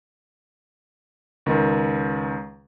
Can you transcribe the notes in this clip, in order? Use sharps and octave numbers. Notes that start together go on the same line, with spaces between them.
C#2 D#3